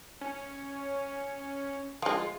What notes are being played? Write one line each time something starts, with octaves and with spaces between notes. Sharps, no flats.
C#4
F3 G#3 F4